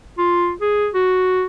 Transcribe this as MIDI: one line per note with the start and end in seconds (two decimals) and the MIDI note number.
0.18 0.53 65
0.61 0.89 68
0.94 1.46 66